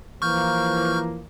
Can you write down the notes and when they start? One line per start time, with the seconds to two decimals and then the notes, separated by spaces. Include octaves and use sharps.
0.22 E3 F3 A#3 C#6 F6 G6